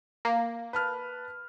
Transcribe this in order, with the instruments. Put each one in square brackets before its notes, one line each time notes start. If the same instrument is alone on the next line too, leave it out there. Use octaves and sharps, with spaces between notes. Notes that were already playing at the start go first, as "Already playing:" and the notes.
[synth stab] A#3
[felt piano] B4 A5 F6